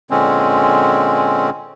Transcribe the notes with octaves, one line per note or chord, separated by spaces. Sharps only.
A#2 D3 G#3 C4 C#4